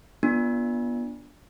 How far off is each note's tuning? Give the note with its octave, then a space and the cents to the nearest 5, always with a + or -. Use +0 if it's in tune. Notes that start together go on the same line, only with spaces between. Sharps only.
B3 -30 D4 -5 F4 -20